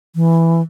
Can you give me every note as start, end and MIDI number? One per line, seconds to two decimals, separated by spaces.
0.15 0.62 52